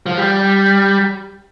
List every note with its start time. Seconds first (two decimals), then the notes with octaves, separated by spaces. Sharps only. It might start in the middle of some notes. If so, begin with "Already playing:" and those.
0.06 F3
0.18 G3